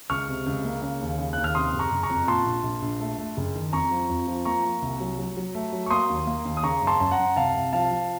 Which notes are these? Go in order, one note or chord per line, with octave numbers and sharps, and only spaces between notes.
C#2 C#6 F6
C3
C#2
A#3
C#3
D#2
C#3
D#2 F#6
F6
C3 C6 D#6
F#1
A#5 C#6
F#1
A#5 C#6
F2
A#2 A5 C6
A#1
A#1
A#1
A3
A3
F#1
D#3
F2 A#5 C#6
F3
F2
F3
A#3 A#5 C#6
A#3
C2
F#3
F#3
F#3
A3
F#3
C#6
A#3 C6 D#6
D#2
A#3
D#2
D#6
C#3 A#5 C#6
F#2
A5 C6
F#2 A5
F#5 A#5
F#2
C2 F5 A5
C2
F3 F5 A5
F3